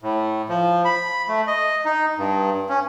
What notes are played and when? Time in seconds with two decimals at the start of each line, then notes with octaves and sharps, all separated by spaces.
0.02 A2
0.49 F3
0.85 B5
1.28 A3
1.47 D#5
1.85 D#4
2.18 G2
2.69 C#4